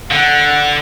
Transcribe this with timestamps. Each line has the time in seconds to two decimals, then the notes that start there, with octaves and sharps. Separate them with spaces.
0.11 D3 F#5